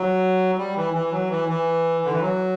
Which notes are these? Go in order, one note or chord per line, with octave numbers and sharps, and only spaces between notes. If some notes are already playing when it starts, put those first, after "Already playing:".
Already playing: F#3
G3
E3
E3
F#3
E3
E3
D3
E3
F#3